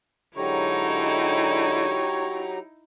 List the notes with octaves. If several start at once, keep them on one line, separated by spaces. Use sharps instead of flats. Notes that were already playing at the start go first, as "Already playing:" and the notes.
G#2 D3 F#3 D#4 E4 G4 C#5 A#5